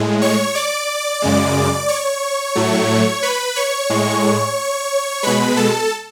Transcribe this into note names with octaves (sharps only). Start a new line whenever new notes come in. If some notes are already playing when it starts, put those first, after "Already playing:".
Already playing: A2 G#3
C#5 C#6
D5 D6
F#2 C#3 G#3
C#5 C#6
A2 F#3 A3
B4 B5
C#5 C#6
A2 G#3
B2 G#3 B4 B5
A4 A5